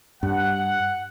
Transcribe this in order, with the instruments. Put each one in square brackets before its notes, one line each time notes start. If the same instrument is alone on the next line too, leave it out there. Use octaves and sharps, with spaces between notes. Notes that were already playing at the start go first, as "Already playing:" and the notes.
[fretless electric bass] G2 [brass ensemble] F#5